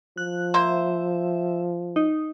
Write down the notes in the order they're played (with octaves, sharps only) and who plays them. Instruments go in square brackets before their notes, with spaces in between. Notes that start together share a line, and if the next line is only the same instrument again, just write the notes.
[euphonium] F3 [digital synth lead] F#6
[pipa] A#3 C5 [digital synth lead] E5
[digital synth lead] D#4